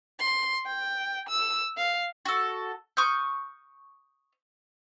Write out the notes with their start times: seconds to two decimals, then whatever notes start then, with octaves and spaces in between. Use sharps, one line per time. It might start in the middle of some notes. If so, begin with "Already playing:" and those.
0.20 C6
0.66 G5
1.29 E6
1.77 F5
2.25 F#4 A4
2.97 C#6 D#6 F6 G6